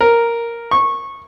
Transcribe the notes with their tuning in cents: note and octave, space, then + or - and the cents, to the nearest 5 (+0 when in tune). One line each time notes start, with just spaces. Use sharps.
A#4 +0
C#6 -15